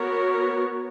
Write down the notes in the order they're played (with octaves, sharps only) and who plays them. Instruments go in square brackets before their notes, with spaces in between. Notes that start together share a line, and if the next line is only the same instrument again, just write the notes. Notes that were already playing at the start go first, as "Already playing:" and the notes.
Already playing: [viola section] B3 F#4 A#4 C#5